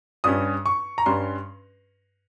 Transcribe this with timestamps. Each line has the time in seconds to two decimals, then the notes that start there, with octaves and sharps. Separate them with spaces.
0.24 G2 G3 C#4 D#6
0.66 C#6
0.98 A#5
1.06 G2 G3 C#4 C6